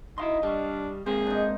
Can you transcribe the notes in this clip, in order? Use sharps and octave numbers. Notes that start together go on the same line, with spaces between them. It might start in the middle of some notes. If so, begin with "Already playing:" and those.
D#4 E4 D#5 F5 C6
G3 D4 F5 C#6
G#3 A#3 C4 G#4 C5
D4 D#4